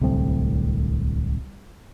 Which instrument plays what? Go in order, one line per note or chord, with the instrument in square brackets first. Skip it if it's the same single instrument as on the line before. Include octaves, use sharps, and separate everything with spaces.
[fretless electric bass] D1 C2 A3 C4